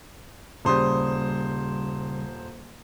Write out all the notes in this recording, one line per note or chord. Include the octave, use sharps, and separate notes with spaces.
D#1 C#3 G3 C5 D#6